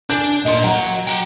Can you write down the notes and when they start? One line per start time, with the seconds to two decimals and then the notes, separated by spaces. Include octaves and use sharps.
0.10 D4 G#5 G6
0.45 A#2 A#3 D#5 C6
0.64 F#3 F#5 A#5
1.07 F#4 G5